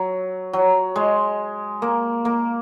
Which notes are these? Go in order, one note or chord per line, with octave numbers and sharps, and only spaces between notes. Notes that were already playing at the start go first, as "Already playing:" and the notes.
Already playing: F#3
F#3
G#3
A#3
A#3